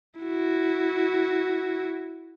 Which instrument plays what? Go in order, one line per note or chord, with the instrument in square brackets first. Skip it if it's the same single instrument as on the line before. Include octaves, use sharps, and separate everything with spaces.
[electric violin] E4 F#4